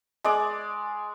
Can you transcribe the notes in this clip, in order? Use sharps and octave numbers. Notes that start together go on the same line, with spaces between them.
G#3 D5 D6